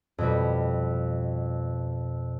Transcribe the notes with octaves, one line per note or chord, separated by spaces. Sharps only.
F2 B2 G3